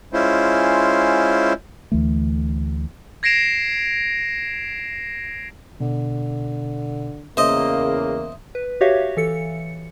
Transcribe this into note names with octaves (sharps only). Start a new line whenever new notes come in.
G#3 C#4 E4 F4 C5
D2 E3 A3
G#6 A#6 C7 D7 E7 F7
B2 D3
E2 C#3 A#3 C5 D#5 E5
B4
F#4 G4 C#5 E5 F5
E3 A4 C#7